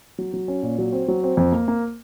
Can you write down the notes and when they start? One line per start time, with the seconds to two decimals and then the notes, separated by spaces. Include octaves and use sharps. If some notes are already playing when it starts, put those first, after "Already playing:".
0.18 F#3
0.34 F#3
0.48 C#4
0.63 A#2
0.79 F#3
0.92 C4
1.08 F#3
1.23 C4
1.37 F2
1.52 A#3
1.68 A#3